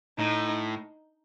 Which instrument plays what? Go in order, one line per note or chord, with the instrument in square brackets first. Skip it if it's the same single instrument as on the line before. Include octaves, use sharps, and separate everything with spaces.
[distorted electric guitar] A2 [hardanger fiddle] D#4